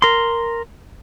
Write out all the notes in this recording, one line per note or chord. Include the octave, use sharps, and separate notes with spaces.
A#4 C6